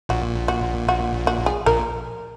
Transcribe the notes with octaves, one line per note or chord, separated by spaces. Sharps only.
A#1 A#2 F#4
F#4
F#4
F#4
G#4
A#1 A#2 A#4